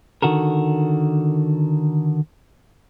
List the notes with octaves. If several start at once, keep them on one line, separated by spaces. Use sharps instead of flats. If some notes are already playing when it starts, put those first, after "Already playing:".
D3 D#3 F#4 A4 A#4